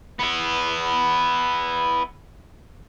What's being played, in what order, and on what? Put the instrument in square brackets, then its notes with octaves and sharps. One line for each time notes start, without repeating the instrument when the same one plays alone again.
[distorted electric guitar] B3 E4